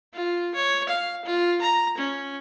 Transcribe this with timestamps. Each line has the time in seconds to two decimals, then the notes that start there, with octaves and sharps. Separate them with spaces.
0.14 F4
0.55 C#5
0.89 F5
1.25 F4
1.62 A#5
1.98 C#4